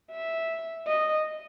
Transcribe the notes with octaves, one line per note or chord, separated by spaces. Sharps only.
E5
D#5